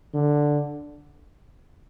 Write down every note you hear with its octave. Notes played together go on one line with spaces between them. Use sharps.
D3